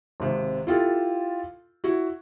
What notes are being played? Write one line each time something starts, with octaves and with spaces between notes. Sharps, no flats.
G#1 C3
E4 F4 G4 A4
E4 F#4